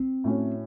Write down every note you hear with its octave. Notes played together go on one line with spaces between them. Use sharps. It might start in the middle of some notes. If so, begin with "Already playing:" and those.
Already playing: C4
A2 A3 C#4 F#4